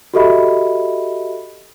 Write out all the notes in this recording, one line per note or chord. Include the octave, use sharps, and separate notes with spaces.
F#4 G4 A4 D#5 E5 B5